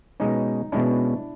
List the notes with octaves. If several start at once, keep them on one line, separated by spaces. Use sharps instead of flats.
B2 G#3 C#4 D#4
B2 G#3 C#4 D4 E4